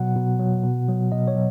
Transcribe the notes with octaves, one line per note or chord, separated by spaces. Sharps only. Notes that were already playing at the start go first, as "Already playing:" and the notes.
Already playing: B2 F#3 F#5
B2
F#3
B2
F#3
B2 D#5
C#5
F#3